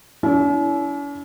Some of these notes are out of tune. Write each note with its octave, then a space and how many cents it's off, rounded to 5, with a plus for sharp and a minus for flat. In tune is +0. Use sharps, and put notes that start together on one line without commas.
C#4 +45 E4 +0